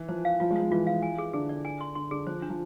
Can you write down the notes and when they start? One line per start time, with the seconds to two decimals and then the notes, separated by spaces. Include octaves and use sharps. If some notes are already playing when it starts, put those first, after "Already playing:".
Already playing: E3
0.09 F3 C5
0.25 F5
0.40 F3 F4
0.51 G#3
0.56 F3 F4
0.71 E3 F4
0.87 F5
1.03 G#5
1.18 G#4
1.33 D3 G#4
1.49 D5
1.65 G#5
1.81 C6
1.95 D3 C6
2.11 D3 G#4
2.26 F3 C5
2.42 D4
2.50 F3